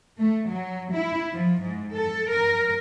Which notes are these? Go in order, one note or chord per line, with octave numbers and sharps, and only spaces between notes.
A3
F#3
E4
F3
G#2
A4
A#4